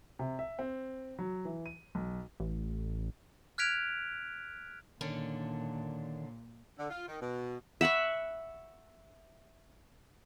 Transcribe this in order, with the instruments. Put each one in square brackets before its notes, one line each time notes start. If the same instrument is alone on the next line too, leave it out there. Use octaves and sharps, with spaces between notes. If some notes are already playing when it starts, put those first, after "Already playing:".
[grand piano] C3
E5
C4
F#3
E3
D#7
B1
[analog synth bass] A1
[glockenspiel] F6 F#6 G#6 B6 D7 F7
[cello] A#2 [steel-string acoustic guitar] D3 C#4 D4 [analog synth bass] D#3
[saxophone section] D3
F4
D#3
B2
[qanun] E5 F#5 B5 C#6